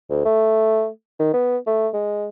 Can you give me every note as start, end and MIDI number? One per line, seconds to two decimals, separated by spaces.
0.10 0.25 38
0.26 0.87 57
1.20 1.29 51
1.34 1.57 59
1.67 1.88 57
1.94 2.28 56